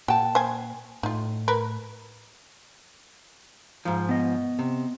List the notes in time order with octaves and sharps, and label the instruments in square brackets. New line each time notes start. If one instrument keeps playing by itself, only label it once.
[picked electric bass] A#2 [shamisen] F#4 [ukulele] G5 A5
[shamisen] C5 G#5
[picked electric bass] A2 [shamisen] D#4 F4
[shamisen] A#4 B4
[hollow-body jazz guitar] G#2 F3
[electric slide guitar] B3 D#5
[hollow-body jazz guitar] C3